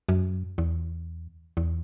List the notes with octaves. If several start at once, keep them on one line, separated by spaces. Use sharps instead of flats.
F#2
E2
E2